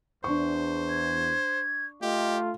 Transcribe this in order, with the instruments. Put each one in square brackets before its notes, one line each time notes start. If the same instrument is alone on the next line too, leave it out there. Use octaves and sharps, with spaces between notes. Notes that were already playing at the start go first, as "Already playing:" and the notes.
[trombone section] E2 [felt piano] D4 C#6 [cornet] C5
[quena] G#6
[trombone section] A3 F4 [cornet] G4 [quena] D#5